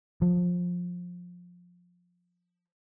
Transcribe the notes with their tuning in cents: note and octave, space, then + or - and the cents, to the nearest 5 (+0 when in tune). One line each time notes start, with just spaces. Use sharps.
F3 +20